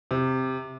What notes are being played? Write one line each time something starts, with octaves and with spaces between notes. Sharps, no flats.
C3